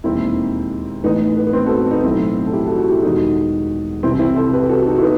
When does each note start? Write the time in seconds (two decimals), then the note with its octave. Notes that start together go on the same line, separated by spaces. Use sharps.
0.04 E1 D#2 D#3 C4 E4
1.04 A1 A2 E3 B3 D#4
1.37 B3
1.47 B3
1.53 C4
1.66 F#4 A4
1.79 B3
1.91 B3 D#4
2.03 B1 A2 E3 C4 E4
2.46 A4
2.53 E4 G4
2.66 F#4 A4
2.78 F#4 A4
2.90 E4 G4
3.03 E1 E2 D#3 D#4 F#4
4.03 C2 C3 E3 C4 E4
4.19 C4 E4
4.36 A4 C5
4.53 G4 B4
4.69 F#4 A4
4.86 D#4 F#4
4.98 E4
5.02 B3 D#4